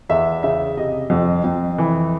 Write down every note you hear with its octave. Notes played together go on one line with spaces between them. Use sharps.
E2 E5
C#3 E5
C3 D#5
F2
F2
E3